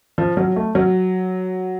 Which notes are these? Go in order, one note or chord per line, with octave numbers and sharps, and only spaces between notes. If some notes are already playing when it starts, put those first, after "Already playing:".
F3
F#3
A3
F#3